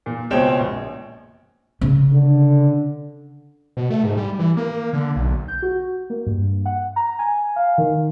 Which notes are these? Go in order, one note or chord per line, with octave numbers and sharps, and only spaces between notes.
A#2
C#2 B2 C4 C#5 G5 E7
A#1
C#3
D3
B2
A3
G#2
G3
E3
A#3
D3
B1
G6
F#4
A#3
G2
F#5
A#5
G#5
F5
D#3